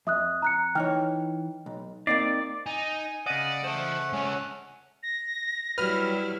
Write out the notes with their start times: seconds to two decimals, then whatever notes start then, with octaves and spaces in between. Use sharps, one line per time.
0.07 F2 E5 D#6 F#6
0.42 A#5 F#6 C#7
0.75 E3 D#4 C#5 G5 F6
1.66 B1
2.07 A#3 C4 D#4 D5 C7
2.66 D#4 G#5
3.26 C#3 D5 D#5 F#5
3.64 A3 C5 A5
4.13 G#3 C#4 C#5 F#5
5.03 A#6
5.78 F#3 G3 E4 B4 F6